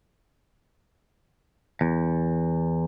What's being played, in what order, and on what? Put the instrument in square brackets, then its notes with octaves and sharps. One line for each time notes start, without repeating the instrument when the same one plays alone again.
[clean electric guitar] E2